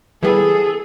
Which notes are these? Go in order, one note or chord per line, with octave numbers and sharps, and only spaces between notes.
E3 G3 B3 G#4 A4